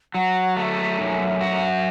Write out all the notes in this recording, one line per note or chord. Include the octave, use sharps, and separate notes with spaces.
F#3 F#5
A3 E5 F#5
F#2
F#4